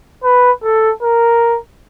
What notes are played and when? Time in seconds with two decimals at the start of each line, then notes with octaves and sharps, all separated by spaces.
0.24 B4
0.63 A4
1.03 A#4